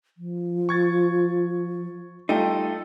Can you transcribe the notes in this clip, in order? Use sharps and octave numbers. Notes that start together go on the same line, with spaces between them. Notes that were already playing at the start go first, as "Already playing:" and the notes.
F3
C#6 G#6 A6
G3 A3 D#4 F4 G4 A4